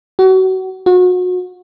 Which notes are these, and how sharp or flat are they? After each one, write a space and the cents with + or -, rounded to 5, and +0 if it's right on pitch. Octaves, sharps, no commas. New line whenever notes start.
F#4 +30
F#4 -30